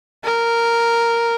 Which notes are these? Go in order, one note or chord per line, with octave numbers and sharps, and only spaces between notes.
A#4